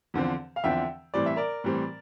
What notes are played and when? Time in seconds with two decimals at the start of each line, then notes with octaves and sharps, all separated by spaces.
0.14 E2 D3 F3 C4
0.56 F5
0.64 E2 D3 F3 C4 E5 G5
1.14 A2 E3 G3 C4 D5
1.26 E5
1.36 A#4 D5
1.64 A2 E3 G3 C4